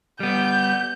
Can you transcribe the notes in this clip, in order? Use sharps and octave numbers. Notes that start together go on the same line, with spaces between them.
G3 B3 G6